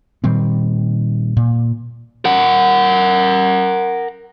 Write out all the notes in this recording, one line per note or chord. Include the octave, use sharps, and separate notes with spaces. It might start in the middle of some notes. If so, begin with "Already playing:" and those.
A#2 D#3 G3 C4
A#2
A#4 F#5